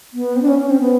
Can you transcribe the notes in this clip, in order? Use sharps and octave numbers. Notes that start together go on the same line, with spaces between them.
B3
C4
D4
C#4
C#4
C4
B3